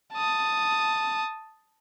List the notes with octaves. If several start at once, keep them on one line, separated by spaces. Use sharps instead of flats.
A5 D#6